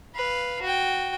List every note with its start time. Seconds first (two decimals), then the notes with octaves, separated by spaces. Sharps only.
0.15 B4 F5
0.62 F#4 G5